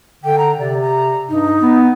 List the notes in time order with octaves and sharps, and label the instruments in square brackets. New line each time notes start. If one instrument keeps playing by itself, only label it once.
[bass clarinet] D3 [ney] G5
[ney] A#5
[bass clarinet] C3 [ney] D5
[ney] A#5
[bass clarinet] G2 [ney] D#4
[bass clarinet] B3